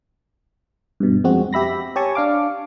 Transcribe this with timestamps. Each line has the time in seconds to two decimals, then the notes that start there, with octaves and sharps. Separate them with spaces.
1.00 G2 B2
1.24 F2 G#3 C4 F#4
1.53 G4 E5 B5 A#6
1.96 G4 C#5 G#5 A5 C#6
2.15 D4 F5 D6